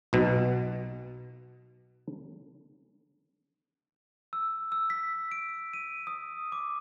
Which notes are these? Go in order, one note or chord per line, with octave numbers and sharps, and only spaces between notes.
B1 B2
E6
E6
B6
D7
D#7
D#6
D6